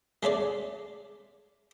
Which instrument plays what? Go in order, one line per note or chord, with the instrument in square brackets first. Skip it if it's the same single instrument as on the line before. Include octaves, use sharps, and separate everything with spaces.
[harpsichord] G#3 A3 C#5 D5